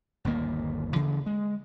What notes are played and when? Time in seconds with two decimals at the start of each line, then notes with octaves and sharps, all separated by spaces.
0.25 G1 D#2 A#2 A#3
0.96 C#3 E3
1.26 G#3